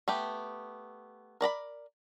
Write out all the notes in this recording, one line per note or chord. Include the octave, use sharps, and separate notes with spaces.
A3 B3 G4
A#4 D5 A#5 B5